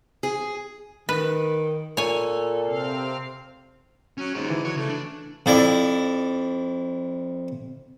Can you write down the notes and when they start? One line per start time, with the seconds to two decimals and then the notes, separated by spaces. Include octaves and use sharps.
0.23 G#4
1.09 D#3 B4
1.97 A#2 A4 C#5 G#5
2.65 C3 C4 F5
4.18 F#3 C#4
4.35 G#2 D#4 G4
4.50 D3 E3
4.65 F#3 C#5
4.76 C#3 A3
4.89 D4
5.46 F2 E4 D5